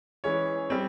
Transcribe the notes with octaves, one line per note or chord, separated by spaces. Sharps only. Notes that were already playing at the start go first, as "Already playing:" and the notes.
E3 G#3 C#4 C#5
G3 C4